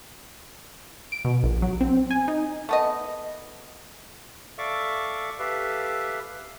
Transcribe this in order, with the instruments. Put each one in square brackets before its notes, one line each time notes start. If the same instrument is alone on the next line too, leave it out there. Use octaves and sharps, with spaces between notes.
[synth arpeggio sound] D7
B2
A#1
F#3
C4
G#5
D#4
[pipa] A3 B3 D#5
[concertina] A4 D5 E5 F5 C#6 D6
G4 A4 B4 E5 F5